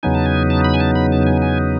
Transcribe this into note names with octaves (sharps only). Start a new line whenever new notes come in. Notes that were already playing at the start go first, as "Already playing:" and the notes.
E2 C#3 F#3 B3 D#4 G#5
A5
G#5
A5
B5
G#5
A5
B5
A5
G#5
G#5